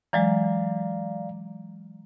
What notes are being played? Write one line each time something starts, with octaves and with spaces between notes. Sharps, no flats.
E3 F#3 G#3 D5 F5 A#5